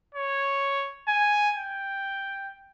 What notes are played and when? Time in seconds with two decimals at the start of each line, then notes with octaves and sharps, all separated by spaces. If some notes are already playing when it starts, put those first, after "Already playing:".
0.15 C#5
1.08 G#5
1.57 G5